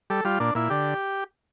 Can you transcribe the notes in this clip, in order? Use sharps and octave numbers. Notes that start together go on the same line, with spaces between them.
G3 A4
G3 F4
A#2 D4
A#2 E4
D3 G4